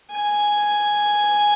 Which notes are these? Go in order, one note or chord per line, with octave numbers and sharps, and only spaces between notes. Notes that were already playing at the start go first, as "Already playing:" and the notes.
G#5